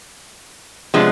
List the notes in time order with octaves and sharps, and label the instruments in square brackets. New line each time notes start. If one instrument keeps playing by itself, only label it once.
[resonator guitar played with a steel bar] C3 F3 G#3 B3 D4